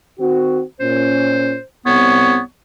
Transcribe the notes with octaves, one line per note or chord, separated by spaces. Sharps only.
D#3 C4 F#4
A#2 C#4 C5
C2 G3 B3 C4 C#5